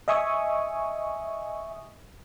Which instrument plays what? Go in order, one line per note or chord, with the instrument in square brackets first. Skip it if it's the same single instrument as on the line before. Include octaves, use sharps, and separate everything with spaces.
[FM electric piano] D#5 E5 G#5 C#6 D#6